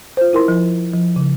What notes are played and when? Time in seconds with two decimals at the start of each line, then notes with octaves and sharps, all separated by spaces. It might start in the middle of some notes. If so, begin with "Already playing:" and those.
0.17 F4 C5
0.33 E4 A#4 C6
0.48 F3
0.93 F3
1.16 C#3